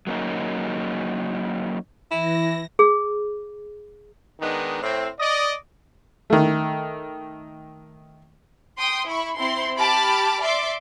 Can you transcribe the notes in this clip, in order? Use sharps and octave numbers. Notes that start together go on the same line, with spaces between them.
F#3 A#3 C#4 D#4
E3 E4 A#6
G#4
D#3 G#3 B3 D4 D#4
A2 C4
D5 D#5
D#3 A3
G5 C6 D#6
E4 B5 C#6
C4 E4 C6
G4 A5 B5 D6 F6
D5 E5 C6 D6